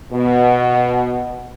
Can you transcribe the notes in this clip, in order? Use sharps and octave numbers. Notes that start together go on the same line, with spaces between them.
B2